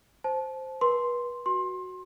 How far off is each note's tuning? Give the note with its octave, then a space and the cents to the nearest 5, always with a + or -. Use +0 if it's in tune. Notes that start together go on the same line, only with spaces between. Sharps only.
C5 +0 A5 -25
B4 -35 C6 +0
F#4 +0 C6 +25